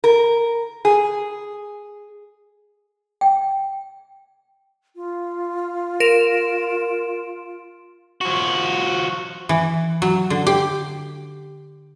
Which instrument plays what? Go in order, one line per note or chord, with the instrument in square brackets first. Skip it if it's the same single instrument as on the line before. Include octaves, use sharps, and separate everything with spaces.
[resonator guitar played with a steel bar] A#4
G#4
[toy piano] G5
[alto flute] F4
[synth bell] A#4 D7 E7
[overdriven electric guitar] F3 F#4
[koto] E3
F#3
D3
G4